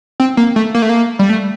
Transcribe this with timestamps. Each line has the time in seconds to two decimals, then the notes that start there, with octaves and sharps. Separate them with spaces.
0.20 C4
0.37 A#3
0.56 A3
0.74 A#3
0.82 A3
0.89 A#3
1.19 G3
1.29 A3